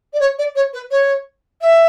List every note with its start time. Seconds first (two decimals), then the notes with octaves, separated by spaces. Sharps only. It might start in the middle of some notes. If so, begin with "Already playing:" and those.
0.13 D5
0.20 C#5
0.38 D5
0.55 C#5
0.73 B4
0.91 C#5
1.61 E5